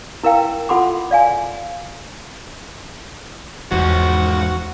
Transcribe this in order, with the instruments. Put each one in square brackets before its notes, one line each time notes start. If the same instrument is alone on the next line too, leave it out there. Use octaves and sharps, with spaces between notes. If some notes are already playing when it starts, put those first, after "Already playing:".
[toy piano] E4 A#4 B4 F5 G5
F4 A4 F#5 B5 C6 D6
D5 F5 G#5
[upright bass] E2 [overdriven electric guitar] G#2 F3 [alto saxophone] F#4